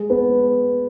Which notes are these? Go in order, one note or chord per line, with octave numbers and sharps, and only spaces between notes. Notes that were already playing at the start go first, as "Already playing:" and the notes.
Already playing: G#3 G#4
B3 B4